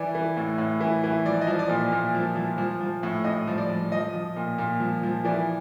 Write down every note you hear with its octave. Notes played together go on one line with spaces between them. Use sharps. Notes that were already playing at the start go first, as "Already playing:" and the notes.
Already playing: E3 D5
E3
A2
A2
E3
E3
F3 D5
D#5
F3
D5
A#2
A#2
F3
F3
F3
F3
A2
A2 D#5
F3
D5
F3
F3 D#5
F3
A#2
A#2
F3
F3
E3 D5